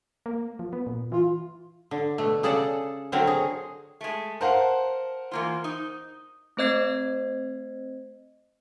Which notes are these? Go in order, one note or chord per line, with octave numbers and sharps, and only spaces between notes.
A#3
F3
B3
A#2
E3 F4
D3
B2 A3
C#3 G#4 A4 D5 F#5 A5
D3 F#3 C4 F#4 A#4 C#5
G#4
G#3 A3
A#4 C5 F5 F#5 A5
E3 A#3 F4
D#4
A3 C4 C5 D#5 G#6 C7